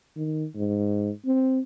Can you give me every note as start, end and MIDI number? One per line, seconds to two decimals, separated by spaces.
0.16 0.46 51
0.55 1.10 44
1.25 1.60 60